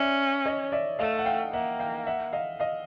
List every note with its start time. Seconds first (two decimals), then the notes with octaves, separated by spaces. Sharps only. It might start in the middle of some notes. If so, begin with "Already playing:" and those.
Already playing: C#4 D5 E5
0.46 C#5 D#5
0.72 D5 E5
0.99 A3 D#5 F5
1.19 F#5
1.25 F5 G5
1.53 A#3 E5 F#5
1.80 F5 G5
2.06 E5 F#5
2.33 D#5 F5
2.60 D#5 F5